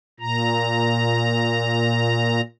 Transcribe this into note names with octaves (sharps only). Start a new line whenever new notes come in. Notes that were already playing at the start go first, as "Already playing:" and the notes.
A#2 A#5